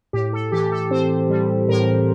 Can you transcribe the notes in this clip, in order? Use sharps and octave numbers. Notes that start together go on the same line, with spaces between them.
A2 G4
A4
E3 G4
A4
C4 C5
G3
A2 A#4